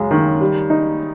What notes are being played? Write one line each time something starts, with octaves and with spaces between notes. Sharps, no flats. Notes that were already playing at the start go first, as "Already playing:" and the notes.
Already playing: F#2 C#3 G#3
D#3
G3
D#4